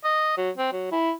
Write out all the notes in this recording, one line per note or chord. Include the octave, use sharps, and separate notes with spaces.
D#5
F#3
C4
F#3
E4